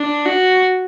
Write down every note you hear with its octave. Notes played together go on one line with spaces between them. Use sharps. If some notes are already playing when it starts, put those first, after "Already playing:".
Already playing: D4
F#4